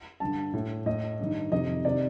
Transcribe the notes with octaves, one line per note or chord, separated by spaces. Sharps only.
G2 D3 A5
A2
A2 D#5
G2 D#3
F2 C3 D#3 D#5
C3 D#3 D5